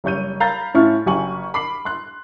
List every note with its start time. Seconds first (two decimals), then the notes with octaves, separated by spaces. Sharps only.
0.04 F#1 G3 C#5 G6 D#7
0.40 F5 A#5 B5 G6 A6
0.74 A2 C#4 E4 F4 C#6 F6
1.06 F#1 F#4 G4 G#5 C#6 F#7
1.54 B5 D6 C7 F#7
1.85 C6 F#6